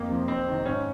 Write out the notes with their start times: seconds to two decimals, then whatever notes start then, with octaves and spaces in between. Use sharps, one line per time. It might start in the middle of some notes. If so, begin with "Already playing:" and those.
Already playing: F2 A#3
0.09 C3 F3
0.28 F2 C4
0.47 C3 D#3
0.66 G#2 C#4